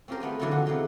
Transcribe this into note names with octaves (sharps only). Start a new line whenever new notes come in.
C4 C#4 F4 G4 A#4 C5
A3 B3 G5 G#5
D3 E3 F#3 D4 E4 F4
F2 B2 D#3 E3
E2 C3 E3 D#4 F4 C6